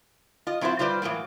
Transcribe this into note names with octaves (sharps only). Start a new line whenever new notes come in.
F4 D#5
F#3 C4 E4 F4 C5
G3 F4 B4 C5 D5
A2 E3 F#3 A#3